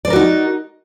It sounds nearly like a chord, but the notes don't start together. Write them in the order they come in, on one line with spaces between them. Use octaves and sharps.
D5 C5 A#4 F#4 D#4